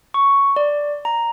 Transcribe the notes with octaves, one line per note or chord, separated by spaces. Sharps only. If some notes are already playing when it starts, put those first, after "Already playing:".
C#6
D5
A#5